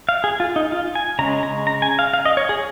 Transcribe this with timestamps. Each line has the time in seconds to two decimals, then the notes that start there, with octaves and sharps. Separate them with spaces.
0.09 F5
0.24 G#4
0.40 F4
0.56 D#4
0.72 F4
0.95 G#5
1.19 C#3 G#3 C#4 A#5
1.43 A#5
1.67 A#5
1.82 G#5
1.99 F5
2.14 F5
2.26 D#5
2.37 C#5
2.49 G#4